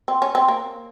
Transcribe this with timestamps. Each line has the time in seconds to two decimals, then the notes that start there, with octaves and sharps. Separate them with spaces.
0.08 C4
0.22 C#4
0.35 C4
0.48 A#3